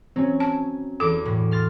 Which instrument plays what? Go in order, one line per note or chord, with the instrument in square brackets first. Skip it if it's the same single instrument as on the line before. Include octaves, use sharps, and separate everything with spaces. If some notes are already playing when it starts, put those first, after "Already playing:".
[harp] F#3 [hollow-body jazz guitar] C4 C#4
[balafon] A5
[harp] E2 D6 [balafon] A4
[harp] A2
C6 F6 A6